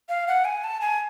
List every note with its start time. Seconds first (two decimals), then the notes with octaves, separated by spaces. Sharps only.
0.09 F5
0.28 F#5
0.45 G#5
0.64 A5
0.81 G#5